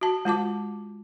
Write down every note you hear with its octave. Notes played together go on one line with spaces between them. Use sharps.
F#4 A5
G#3 F4 A5 D6